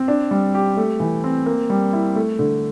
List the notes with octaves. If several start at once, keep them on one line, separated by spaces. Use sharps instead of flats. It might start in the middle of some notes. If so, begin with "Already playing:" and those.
Already playing: C4
D4
G3
G4
A3
E3
C4
A#3
G3
E4
A3
D3